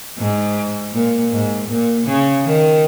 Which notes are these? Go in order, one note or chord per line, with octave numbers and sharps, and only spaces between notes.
G#2
A#2
G#2
A#2
C#3
D#3